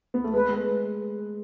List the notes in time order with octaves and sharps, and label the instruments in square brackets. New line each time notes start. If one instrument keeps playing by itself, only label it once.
[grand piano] B3
A3
[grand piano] G#3 [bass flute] B4
[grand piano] G#3